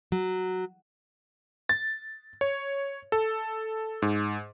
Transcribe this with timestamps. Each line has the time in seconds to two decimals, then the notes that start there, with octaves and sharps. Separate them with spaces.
0.12 F#3
1.69 A6
2.41 C#5
3.12 A4
4.02 G#2